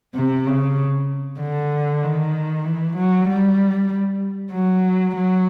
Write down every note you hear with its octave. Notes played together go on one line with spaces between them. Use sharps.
C3
C#3
D3
D#3
E3
F#3
G3
F#3
F#3